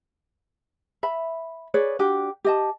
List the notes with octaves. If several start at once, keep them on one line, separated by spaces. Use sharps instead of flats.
E5 B5
G#4 B4 C#5 D5
D4 F#4 G4
G4 D#5 A5